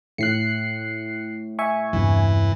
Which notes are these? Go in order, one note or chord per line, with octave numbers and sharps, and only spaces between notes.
A2 F#6 C7 C#7
E5 G#5 C#6
E2 G2 C3 E3